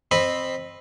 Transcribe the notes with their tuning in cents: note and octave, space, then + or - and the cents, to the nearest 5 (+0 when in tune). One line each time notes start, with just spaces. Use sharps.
C4 +5 D#5 -15 B5 +0